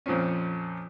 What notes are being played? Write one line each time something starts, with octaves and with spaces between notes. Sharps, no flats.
F2 A#2 F3 C4 C#4